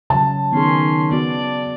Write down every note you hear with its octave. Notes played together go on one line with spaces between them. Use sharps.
C#3 F#3 A5
D#3 B3 C#4 G#4 C6
B3 F#4 D5